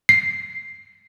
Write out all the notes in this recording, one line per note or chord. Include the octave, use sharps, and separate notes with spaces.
C7